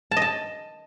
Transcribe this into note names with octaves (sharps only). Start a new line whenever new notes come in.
A5
D#5
A5